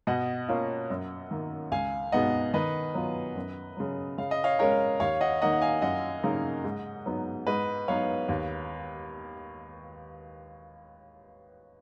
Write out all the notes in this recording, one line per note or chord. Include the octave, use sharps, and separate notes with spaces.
B2 D#5 F#5
A#3 C#4 F4
F#2
D#3 A#3
C#2 F5 G#5
B2 G#3 B3 D#4 D#5 F#5
D#3 B4 D#5
F#3 B3 F4
F#2
C#3 F#3
C#3 F5
D#5
C#5 F5
G#3 C#4 A#4 C#5
D#2 C#5 F5
D#5 F#5
D#3 A#3 D#4 D#5 F#5
F#5
F5 G#5
F#2 D#5 F#5
C#3 F#3 A#3 D#4
G#2
F#3 B3 D#4
G#2 B4 D#5
F#3 B3 D#4 C#5 F5
D#2